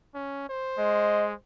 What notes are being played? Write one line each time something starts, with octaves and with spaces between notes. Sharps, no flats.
C#4
C5
G#3 D#5